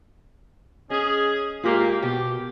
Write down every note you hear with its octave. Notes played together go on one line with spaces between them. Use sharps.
C#4 G#4 D#5
A#2 G#3 A#3 F4 G4
B2 G4